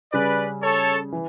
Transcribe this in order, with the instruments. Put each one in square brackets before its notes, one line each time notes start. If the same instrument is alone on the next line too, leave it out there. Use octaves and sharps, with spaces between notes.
[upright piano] C#3 G3 C#4 [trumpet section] B4 D5
[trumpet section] A4 C#5
[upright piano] E3